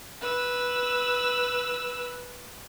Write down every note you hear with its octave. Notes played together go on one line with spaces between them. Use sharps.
B4 E6